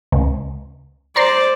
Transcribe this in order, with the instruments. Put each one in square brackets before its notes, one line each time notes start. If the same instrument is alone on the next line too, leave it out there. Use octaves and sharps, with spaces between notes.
[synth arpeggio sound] C#2
[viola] C5 D5 [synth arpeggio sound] A#5 C6